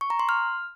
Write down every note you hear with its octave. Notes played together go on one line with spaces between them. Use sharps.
C#6
A#5
C6
F6